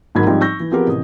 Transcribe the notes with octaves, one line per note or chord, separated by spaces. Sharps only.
G#1 G#2 F#3 A#4 B5 G#6
G#2 F3 G3 C4 D#4 G5
C#6 E6 G6 A#6
E3
F3 B3 C4 G4 G#4 A#4
A1 C3 D#6